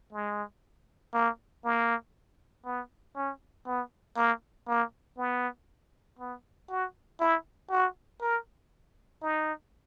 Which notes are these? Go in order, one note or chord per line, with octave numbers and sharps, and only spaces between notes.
G#3
A#3
A#3
B3
C#4
B3
A#3
A#3
B3
B3
F#4
E4
F#4
A#4
D#4